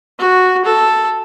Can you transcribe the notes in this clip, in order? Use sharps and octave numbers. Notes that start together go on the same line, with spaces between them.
F#4
A4